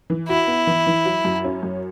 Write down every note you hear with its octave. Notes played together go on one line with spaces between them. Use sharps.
E3
E4 F#4
B3
E3
E3
F#3
F#2
C#4
F#2